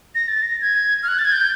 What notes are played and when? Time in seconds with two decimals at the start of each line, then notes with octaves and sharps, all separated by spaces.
0.15 A#6
0.28 A6
0.42 A#6
0.61 G#6
1.03 F6
1.08 F#6
1.19 A6
1.25 G#6
1.32 G6